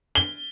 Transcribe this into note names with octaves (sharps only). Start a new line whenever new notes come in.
G7